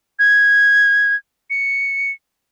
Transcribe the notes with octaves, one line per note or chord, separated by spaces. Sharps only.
G#6
C#7